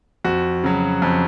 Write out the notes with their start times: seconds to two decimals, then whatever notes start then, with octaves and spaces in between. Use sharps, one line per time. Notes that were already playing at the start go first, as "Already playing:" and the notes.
0.24 F2 F#4
0.64 C#3 F#3
1.02 F2